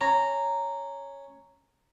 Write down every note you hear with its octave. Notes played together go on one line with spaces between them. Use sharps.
C#4 A#5